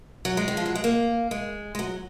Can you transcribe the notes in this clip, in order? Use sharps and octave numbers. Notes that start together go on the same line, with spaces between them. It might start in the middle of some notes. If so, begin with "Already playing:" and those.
F#3
G#3
D#3
F3
F#3
G#3
A#3
G#3
G#3
F#3